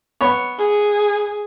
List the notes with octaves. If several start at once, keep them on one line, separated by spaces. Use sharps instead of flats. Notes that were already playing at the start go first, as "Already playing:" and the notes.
B3 C#5
G#4